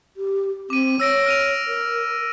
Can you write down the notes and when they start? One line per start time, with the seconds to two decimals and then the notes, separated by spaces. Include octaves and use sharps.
0.17 G4
0.70 C4 D6 D#7
1.00 C#5 E6 A#6 D7
1.26 F6 D#7 F7
1.67 A#4